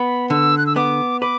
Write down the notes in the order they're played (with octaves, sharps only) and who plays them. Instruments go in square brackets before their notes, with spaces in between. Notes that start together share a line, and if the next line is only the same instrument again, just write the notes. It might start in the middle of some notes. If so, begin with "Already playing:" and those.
Already playing: [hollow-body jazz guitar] B3 [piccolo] B5
[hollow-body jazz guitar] D3 [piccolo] E6
[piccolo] F#6
E6
[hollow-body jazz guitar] B3 [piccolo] D6
[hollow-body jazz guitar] B4 [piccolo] D6